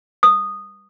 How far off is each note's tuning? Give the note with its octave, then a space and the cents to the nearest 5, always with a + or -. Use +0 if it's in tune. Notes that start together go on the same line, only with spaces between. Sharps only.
D#6 -10